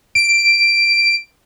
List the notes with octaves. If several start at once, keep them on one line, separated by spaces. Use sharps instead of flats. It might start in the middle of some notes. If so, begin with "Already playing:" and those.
D7